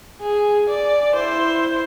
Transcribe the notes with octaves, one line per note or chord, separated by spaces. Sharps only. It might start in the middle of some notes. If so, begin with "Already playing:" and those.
G#4
D5
E4 C5